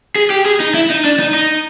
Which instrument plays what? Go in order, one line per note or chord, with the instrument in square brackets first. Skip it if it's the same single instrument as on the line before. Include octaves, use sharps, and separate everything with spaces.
[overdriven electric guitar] G#4
G4
G#4
D#4
E4
D#4
D4
D#4
D#4